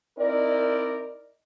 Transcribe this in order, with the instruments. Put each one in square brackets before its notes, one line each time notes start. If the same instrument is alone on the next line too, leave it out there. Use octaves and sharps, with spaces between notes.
[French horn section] C4 D#4 E4 A#4 D5